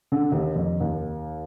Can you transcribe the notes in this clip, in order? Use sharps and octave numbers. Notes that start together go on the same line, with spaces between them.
D3
D#2
F2
D#2